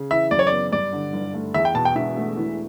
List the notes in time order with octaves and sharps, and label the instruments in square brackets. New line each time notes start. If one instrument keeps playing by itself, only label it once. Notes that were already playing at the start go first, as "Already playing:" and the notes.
Already playing: [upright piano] C#3
[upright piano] E3 [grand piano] E5
[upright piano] F#2 [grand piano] D5
[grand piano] C#5
D5
[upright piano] B3
[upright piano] G2 [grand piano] D5
[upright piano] D3
G1
A3
[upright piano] E2 [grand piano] E5
[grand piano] G5
[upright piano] B2 [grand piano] A5
[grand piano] G5
[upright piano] E1 [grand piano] E5
[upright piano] A3
E3